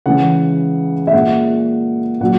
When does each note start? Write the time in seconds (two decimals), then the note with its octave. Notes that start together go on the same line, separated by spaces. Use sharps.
0.06 C#3 E3 G#3 F#5
1.07 E5
1.13 A#2 G#3 F#5
2.20 A#2 F#3 F#5